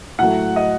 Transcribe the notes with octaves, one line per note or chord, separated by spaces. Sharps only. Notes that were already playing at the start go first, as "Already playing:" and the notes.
A2 F#3 A3 F#5
D#5